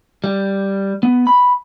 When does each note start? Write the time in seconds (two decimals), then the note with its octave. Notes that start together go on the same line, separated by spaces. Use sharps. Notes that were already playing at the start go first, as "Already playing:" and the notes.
0.24 G3
1.03 B3
1.27 B5